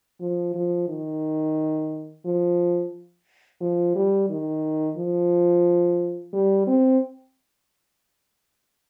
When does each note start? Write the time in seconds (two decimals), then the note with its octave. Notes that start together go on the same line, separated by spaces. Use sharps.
0.21 F3
0.54 F3
0.88 D#3
2.25 F3
3.61 F3
3.96 G3
4.29 D#3
4.97 F3
6.33 G3
6.67 C4